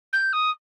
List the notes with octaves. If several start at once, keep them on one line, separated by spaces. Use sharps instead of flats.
G6
D#6